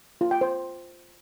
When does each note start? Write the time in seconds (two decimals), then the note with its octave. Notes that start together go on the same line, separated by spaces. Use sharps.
0.21 F4
0.31 G5
0.41 C5